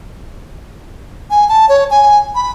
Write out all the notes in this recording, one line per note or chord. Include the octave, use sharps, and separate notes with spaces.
G#5
A5
C#5
G#5
B5